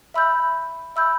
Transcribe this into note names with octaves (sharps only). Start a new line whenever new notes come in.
E5 B5 E6 G6
E5 B5 E6 G6